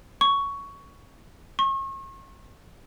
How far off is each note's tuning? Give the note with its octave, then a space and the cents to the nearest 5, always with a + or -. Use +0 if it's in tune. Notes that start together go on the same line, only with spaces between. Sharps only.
C#6 +10
C#6 -40